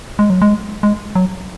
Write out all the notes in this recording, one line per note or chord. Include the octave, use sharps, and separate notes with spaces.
G#3
F#3
G#3
G#3
F#3